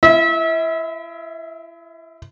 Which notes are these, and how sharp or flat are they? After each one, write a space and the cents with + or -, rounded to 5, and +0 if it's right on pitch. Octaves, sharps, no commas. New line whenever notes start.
E4 +35 E5 -30